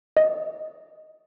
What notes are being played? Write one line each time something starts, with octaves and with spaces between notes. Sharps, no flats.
D#5